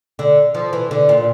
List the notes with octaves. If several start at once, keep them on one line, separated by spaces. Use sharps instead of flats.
D3
F3
E3
D3
A#2